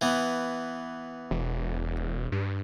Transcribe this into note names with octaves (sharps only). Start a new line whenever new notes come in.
E3 B3
E1
G2